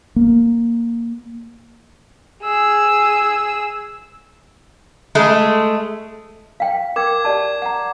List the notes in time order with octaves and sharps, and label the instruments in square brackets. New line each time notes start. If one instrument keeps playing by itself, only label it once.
[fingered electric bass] A#3
[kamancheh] G#4 E6
[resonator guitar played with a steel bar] G#3 A3
[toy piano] F5 G5
[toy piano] A#4 G5 [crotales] D6 G#6
[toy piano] G4 D5 A5
F#5 A#5